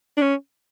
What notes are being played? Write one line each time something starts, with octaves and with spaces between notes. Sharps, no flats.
D4
C#4